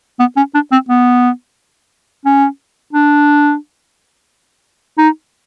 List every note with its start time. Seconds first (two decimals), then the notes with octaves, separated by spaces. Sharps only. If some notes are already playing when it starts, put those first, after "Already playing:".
0.19 B3
0.37 C#4
0.54 D4
0.72 C4
0.89 B3
2.25 C#4
2.93 D4
4.98 D#4